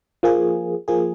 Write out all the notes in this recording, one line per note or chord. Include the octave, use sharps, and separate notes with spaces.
F3 A#3 G#4
F3 A#3 G#4